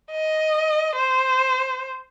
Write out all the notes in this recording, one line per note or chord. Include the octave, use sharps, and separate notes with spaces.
D#5
C5